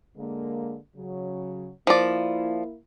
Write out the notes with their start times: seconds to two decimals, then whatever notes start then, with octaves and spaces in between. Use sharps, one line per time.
0.16 D3 G#3 A#3
0.96 C#3 F#3
1.87 F3 A#3 E4 D5